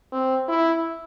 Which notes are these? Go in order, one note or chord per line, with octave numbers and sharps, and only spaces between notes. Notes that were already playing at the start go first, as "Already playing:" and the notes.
C4
E4